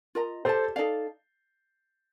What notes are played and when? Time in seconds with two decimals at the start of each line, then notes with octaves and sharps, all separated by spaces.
0.15 F4 A#4 D#5 A#5
0.45 G4 A4 C5 D5 A5
0.76 D#4 A4 D5 F5